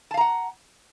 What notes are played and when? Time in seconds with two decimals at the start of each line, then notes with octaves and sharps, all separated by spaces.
0.11 A5
0.14 F5
0.17 A#5
0.21 F#5